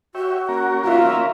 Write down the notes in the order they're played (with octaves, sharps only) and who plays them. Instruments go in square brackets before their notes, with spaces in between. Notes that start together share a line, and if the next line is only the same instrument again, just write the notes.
[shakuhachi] F#4 [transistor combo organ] G4 C#5 E5
[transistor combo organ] A#3 C#4 A#4
[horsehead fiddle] F4 E5